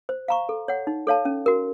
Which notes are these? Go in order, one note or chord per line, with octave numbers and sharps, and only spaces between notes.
C5
F5 A#5 C#6
A4
C#5 F#5
D#4
A4 C#5 F5 A5
C#4
F#4 A#4